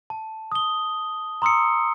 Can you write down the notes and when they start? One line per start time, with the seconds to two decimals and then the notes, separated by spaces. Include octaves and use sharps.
0.10 A5
0.52 D#6 G7
1.42 A#5 C6 D#6 E6 C#7